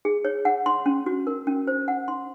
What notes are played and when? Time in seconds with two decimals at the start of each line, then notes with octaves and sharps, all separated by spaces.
0.05 G#4
0.25 C#5
0.45 F#5
0.66 C6
0.86 C#4
1.06 F#4
1.27 A#4
1.47 C#4
1.67 C5
1.88 F#5
2.08 C6